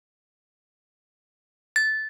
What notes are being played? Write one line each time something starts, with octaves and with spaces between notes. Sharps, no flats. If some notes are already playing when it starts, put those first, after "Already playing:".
A6